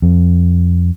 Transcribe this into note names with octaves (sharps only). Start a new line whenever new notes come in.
F2